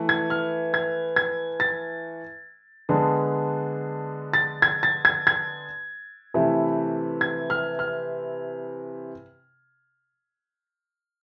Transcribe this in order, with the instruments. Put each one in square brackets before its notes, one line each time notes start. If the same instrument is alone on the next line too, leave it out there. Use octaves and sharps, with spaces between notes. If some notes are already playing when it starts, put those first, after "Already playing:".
Already playing: [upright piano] E3 A3 E4
G#6
F6
G#6
G#6
A6
D3 G#3 B3 D4
A6
G#6
A6
G#6
G#6
C3 E3 A3 E4
G#6
F6
F6